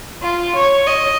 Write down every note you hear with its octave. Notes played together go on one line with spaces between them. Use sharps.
F4
C#5
D#5